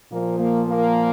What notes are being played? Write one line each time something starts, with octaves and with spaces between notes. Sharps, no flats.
A#2 F3 A#3
A#3
A#3